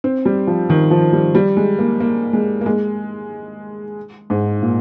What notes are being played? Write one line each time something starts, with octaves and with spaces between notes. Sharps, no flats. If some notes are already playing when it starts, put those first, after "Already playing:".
C4
G3
F3
D#3
F3
G3
G3
G#3
A#3
A#3
G#3
A#3
G#3
G#2
A#2